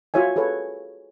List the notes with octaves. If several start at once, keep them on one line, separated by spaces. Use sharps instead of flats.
F4 F#4 C#5 E5 G#5
G#4 A4 B4 C#5